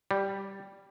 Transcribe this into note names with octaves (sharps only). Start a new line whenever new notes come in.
G3